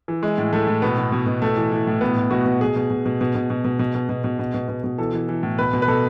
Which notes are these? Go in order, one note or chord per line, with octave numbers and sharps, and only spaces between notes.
E3
E3 G#3
A2
A2 A3
A2
B2 B3
B2
B2
B2
A2 A3
E3
E3
A2
B2 B3
B2
B2 F#4
B2
B2 G#4
B2
B2
B2
B2
B2
B2
B2
B2
B2
B2
B2
B2
B2
B2
B2
E3 A4
E3
E3
A2
B2 B4
B2
B4
B2 A4